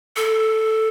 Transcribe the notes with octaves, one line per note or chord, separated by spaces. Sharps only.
A4